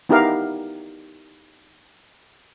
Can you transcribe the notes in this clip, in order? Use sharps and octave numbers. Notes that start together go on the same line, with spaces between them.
B3 D#4 E4 G4 A#4 F5